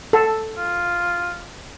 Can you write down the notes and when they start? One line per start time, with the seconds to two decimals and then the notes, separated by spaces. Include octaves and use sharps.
0.13 A4
0.57 F4